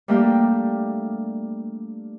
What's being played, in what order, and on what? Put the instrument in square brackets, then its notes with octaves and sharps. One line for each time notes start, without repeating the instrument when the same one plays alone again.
[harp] G3 A3 A#3 D4 G4